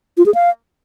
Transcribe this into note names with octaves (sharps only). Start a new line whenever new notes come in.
F4
G#4
F5